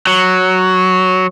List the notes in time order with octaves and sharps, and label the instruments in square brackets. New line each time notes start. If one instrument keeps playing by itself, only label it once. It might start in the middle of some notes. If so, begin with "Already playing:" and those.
[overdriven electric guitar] F#3